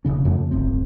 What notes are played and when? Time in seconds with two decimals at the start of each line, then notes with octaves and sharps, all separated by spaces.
0.05 E1 D#2 C#3 C#4
0.25 F2 F3 A3
0.38 C#3
0.51 D1 G1 C4